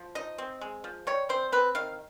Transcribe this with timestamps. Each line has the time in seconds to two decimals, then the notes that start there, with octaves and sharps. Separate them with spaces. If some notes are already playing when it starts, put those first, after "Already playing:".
Already playing: F3
0.15 D#4 D#5
0.38 C4
0.61 G#3
0.84 F3
1.07 G3 C#5
1.29 C4 C5
1.52 C4 B4
1.75 D#3 F5